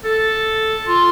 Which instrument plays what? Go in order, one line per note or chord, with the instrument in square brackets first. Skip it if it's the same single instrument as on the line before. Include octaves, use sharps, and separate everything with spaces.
[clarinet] A4
F4